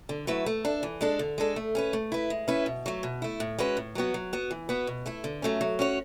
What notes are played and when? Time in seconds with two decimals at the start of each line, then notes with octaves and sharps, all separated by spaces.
0.09 D3
0.27 F#3 A3 E4 B4
0.46 A3
0.65 D4 A4
0.83 E3
1.01 G#3 D4 A4
1.19 D3
1.38 G#3 D4 A4
1.56 A3
1.75 C#4 G#4 B4
1.93 A3
2.12 E4 B4
2.30 G#3
2.48 C#4 E4 B4
2.66 B2
2.86 F#3 A3
3.03 B2
3.22 A3 E4
3.40 A2
3.58 G#3 C#4 F#4 B4
3.77 A2
3.95 F#3 B3 F#4
4.14 F#3
4.33 B3 F#4
4.51 E3
4.69 B3 F#4 B4
4.87 B2
5.06 A3 E4 A4
5.24 D3
5.42 F#3 A3 C#4
5.61 F#3
5.79 C#4 F#4 C#5